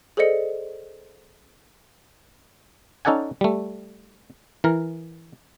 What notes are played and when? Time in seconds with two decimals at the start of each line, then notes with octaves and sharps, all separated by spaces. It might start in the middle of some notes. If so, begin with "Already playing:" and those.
0.17 G#4 A4 C5 D5 D#5 C#7
3.05 C#4 D#4 A4 D5 F#5 G#5
3.41 G3 A3
4.64 E3 A#4